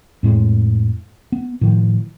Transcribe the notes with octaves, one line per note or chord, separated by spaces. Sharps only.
F2 A2 G#3
B3
A2 D#3 F3